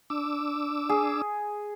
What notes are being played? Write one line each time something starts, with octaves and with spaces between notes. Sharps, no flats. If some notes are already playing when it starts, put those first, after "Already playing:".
D4 D6 E6
G#4